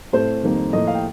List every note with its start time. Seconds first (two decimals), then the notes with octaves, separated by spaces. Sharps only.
0.13 A2 A3 C4 C5
0.43 F2 D#3 G3 A#3
0.73 A2 F3 A#3 D#5
0.87 F5
0.95 G5